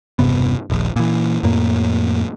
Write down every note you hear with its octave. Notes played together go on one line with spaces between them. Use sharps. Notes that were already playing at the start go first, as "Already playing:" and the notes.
E1 G2 C3 B3
D#1 A#1
A#2 E3
F2 A2 A#3